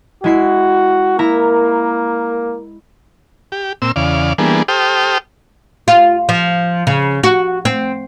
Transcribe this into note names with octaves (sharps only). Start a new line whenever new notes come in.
G#3 E4 F#4 C7
A#3 E4 A#4 A#5
G4
A#2 C4 E6
E2 C#3 D5 F5
E3 G3 A#3 B3 D4 G#4
G4 A4 C5 G5 D#6 F6
F4
F3
C#3
F#4
C4